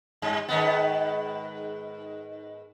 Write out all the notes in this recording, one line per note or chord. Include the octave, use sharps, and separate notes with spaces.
G2
G#2 D#3 B3